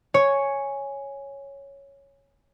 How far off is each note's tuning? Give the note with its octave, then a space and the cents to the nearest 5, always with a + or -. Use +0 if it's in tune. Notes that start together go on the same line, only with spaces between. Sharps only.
C#5 +0 G#5 +0